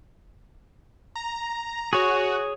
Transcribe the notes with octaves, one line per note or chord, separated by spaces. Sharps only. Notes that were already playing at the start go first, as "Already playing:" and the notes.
A#5
F#4 G#4 C#5